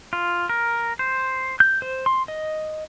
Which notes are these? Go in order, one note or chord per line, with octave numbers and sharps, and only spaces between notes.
F4
A#4
C5
G6
C5
C6
D#5